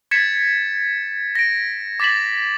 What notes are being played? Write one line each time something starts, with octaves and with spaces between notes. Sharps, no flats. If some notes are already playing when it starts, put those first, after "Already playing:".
G#6 A6 B6 C#7 E7
A#6 D7
D6 A6 B6 E7 F#7